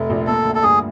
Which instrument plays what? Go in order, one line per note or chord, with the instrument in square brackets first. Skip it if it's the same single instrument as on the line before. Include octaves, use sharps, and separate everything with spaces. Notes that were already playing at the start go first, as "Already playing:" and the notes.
Already playing: [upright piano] F1 A3
A#1
[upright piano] A#3 [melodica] A4
[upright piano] D2
[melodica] A4
[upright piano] G2 [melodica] G#4